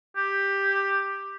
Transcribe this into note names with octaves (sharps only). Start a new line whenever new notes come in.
G4